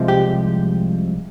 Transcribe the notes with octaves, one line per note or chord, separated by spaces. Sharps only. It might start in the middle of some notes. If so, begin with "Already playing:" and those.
Already playing: C2 C3 F3 G#3
G4